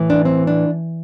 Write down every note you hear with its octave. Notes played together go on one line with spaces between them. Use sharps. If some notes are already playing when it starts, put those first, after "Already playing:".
Already playing: A2 E3
D4
C4
D4